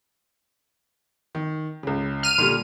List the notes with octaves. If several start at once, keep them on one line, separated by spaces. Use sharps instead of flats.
D#3
C#2 C#3
F6 D#7
A#2 D3 G3